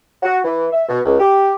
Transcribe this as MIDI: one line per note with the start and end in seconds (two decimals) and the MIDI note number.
0.23 0.39 66
0.44 0.67 52
0.72 0.84 76
0.89 1.00 47
1.05 1.19 37
1.20 1.54 67